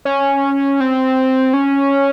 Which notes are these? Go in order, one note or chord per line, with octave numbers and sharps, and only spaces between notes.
C#4
C4
C#4